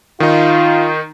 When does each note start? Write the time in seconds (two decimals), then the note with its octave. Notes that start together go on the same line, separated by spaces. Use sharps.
0.20 D#3 D#4 F4